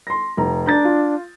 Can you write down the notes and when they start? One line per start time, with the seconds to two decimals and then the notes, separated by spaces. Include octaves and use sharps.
0.07 C6 A#6
0.37 F1 A#5
0.66 D4 A#5 G6 A6
0.85 F4